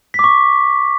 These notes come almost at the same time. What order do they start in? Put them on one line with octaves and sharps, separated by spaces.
B6 D6 C#6